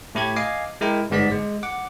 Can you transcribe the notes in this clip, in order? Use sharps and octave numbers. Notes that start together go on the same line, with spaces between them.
A2 E4 G4 G#6
D#5 F5 G#5 D6 C7
G#3 E4 A#4 G5
G1 G#2 B3 D5 B6
G#3
F#5 D6